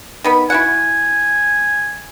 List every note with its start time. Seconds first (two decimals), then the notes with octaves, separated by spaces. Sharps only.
0.24 D#3 B3 B5
0.50 E4 F#4 F#5 G#5